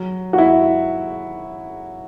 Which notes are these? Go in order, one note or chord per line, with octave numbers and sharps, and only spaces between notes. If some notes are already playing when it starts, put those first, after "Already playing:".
Already playing: F#3
F#4
E4